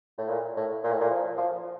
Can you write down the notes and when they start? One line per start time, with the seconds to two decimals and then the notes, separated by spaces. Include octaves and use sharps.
0.18 A2
0.29 A#2
0.57 A2
0.84 A#2
0.92 A2
1.01 A#2
1.11 F3
1.38 F3